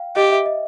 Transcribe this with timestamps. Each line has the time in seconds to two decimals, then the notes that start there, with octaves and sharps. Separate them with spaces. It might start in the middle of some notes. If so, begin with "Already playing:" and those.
Already playing: F5 G5
0.16 G4 D#5
0.31 E5
0.46 D#5